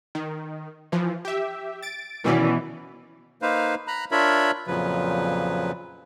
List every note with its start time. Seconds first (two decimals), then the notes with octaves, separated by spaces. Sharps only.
0.15 D#3
0.92 E3 F3
1.25 G4 E5
1.83 A6 D7
2.24 B2 D#3 E3 C#4 D5
3.42 A#3 D#4 B4 C5 F5
3.88 A#5 B5 F#6
4.11 D4 F4 A#4 C#5 E5 B5
4.67 F2 A#2 C#3 F3 F#3 B4